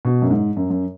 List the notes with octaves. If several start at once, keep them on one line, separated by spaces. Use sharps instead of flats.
B2
F#2
G#2
F#2
F#2